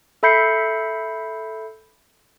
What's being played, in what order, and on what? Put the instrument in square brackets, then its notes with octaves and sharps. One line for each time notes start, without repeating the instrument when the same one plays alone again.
[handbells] A4 E5 B5 G6 C7 C#7